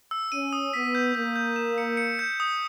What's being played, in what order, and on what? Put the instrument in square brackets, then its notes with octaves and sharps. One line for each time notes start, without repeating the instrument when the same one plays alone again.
[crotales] E6
[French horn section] C#4 [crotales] D#7
[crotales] D#6
[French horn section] B3 [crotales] B6
[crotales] G6
[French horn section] A#3 [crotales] G6
[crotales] G6
E7
C#7
C#7
G6
D#6